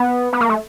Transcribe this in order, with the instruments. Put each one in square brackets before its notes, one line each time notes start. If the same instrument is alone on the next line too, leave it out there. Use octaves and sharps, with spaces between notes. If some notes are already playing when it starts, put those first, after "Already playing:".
Already playing: [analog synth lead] B3
B3
A#3
A3